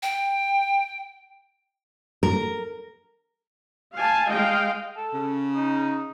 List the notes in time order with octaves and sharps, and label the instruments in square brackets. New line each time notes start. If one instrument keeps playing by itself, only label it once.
[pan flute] G5
[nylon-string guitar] A#4
[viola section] F5 G#5 A5
G#3 D#5 F5 G5
[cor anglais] A4
[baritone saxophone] C#3
[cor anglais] D#4